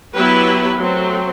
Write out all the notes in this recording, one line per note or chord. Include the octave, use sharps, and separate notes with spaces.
F#3 B3 E4 G4 B4
F#3 A3 C4